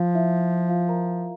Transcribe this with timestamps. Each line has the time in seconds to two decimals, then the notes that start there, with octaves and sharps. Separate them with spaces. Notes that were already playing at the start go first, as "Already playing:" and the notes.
Already playing: F3 F4 F5
0.15 E4 E5
0.69 F4 F5
0.88 A#4 A#5